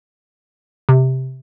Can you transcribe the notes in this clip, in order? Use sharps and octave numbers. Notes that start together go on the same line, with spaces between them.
C3